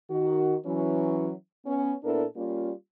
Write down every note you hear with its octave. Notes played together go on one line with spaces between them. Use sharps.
D#3 F#4
E3 F#3 C#4
B3 C#4
A#2 B3 D4 E4 A4 A#4
G3 A#3 C#4 F4